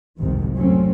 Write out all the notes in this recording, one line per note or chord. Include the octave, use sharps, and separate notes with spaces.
F#1 C2 F2 G#2 C3 D#3
F#2 A2 F#3 A3 C4 C#4